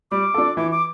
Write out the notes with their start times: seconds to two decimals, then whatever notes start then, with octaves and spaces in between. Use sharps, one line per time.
0.11 G3 D6
0.34 D4 A4
0.57 E3 D6
0.71 D6